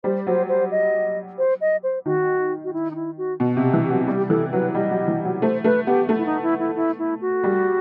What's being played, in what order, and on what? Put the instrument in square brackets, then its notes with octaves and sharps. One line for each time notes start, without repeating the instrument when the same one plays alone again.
[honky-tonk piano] G3 [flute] C5
[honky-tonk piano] F#3 [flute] C5
[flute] C5
D#5
C5
D#5
C5
[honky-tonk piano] D#3 [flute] F#4
[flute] F#4
E4
D#4
E4
F#4
[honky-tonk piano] B2
C3
[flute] G4
[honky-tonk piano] E3
[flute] G4
[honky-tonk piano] F#3
[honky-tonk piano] G3 [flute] G4
[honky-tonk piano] E3 [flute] A4
[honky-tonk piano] F#3 [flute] B4
[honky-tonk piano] G3 [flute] D#5
[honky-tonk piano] F#3
E3
F#3
[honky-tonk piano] A3 [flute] C5
[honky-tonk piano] A3 [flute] B4
[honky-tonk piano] B3 [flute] G4
[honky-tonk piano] A3
[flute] E4
D#4
E4
E4
E4
E4
F#4
[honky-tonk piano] G3